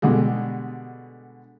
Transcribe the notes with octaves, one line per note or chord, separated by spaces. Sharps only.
B2 D3 G3 G#3